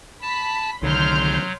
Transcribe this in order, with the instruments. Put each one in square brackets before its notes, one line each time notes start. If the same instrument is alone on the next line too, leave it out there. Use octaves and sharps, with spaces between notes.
[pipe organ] A5 [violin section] B5 B6
[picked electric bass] C2 D#3 [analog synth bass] D3 [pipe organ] F#3 [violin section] C6 F6 G6